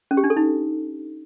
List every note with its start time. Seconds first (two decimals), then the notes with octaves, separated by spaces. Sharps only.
0.11 C#4
0.17 G4
0.24 D4
0.30 A4
0.37 D#4